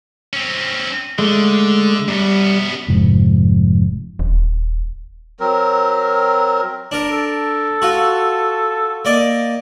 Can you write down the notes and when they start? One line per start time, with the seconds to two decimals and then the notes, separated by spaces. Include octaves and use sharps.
0.33 C4 C#4
1.19 D3 G#3 A3
2.08 F#2 G3 B3
2.88 F1 G#2 F3
4.19 D#1
5.40 F#3 C4 A#4
6.92 D4 A#4
7.12 A4
7.82 F4 F#4
9.05 A#3 D5 D#5